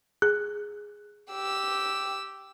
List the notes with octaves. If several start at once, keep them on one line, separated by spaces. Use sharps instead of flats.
G#4
G4 E6